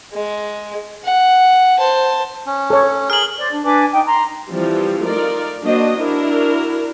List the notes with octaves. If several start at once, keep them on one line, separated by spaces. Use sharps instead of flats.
G#3
F#5
C5 A5
C#4
A4 C#5
G#4 A#4 F6 F#7
C5 D5
D4
D4 B4 G#5 D6
D#4 G5
A#5 C6
E3 F3 G3 C4
A3 D#4 F4 A#4 D5
F#3 A#3 D4 F#4 C5 D#5
D4 E4 F#4 A#4